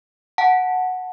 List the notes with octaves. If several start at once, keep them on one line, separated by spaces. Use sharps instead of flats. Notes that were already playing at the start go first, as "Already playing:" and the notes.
F#5 A5